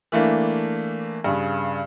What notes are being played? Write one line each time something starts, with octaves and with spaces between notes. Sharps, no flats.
E3 A3 A#3 D4
G2 C#3